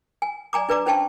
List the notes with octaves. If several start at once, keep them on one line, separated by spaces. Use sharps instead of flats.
G#5
D5 G#5 A#5 D6
D4 B4 D5 A#5 D6
C#4 D4 C5 G5 A5 C#6